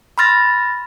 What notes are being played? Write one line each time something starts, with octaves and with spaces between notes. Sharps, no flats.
B5 C6 F6 A6 A#6